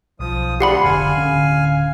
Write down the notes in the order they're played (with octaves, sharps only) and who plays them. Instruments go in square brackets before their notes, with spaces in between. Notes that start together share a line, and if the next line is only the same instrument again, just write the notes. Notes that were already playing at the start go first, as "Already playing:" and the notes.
[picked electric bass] B1 [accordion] F3 D#6
[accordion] D2 D4 C6 [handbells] G4 F#5 B5
[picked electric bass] F1 D3 [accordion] F5 G#5
[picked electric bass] D1 D3 C#4